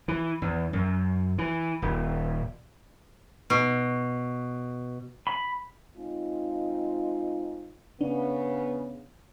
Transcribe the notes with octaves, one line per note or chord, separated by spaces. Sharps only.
E3
E2
F#2
E3
D#1
B2
B5
G#3 C4 D#4 F4
C#3 B3 D4